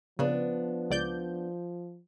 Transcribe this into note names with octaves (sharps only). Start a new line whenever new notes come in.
C#3 F3 B3 D4
C#2 D5 G6